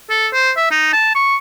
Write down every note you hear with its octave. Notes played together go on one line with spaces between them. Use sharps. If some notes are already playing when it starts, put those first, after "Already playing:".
A4
C5
E5
D#4
A5
C#6